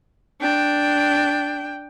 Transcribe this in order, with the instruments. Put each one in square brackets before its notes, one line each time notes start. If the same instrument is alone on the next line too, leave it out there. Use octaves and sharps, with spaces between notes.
[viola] D4 G5